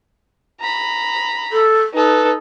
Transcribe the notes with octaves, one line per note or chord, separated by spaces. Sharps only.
A#5 B5
A4
D#4 A4 B4